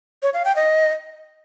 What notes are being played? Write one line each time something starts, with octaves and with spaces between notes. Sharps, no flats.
C#5
F5
G5
D#5